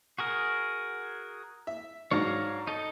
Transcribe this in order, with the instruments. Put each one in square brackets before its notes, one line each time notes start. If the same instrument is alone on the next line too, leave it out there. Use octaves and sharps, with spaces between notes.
[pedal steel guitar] F#4 G#4 A#4
[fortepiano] E5
[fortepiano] G#2 F#3 D4 [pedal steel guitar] C#5 F5 A#5
[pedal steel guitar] D#4 A4 D#5